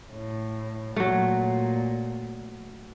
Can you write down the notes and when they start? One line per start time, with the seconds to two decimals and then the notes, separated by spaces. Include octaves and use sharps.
0.11 A2
0.96 A#2 F#3 A3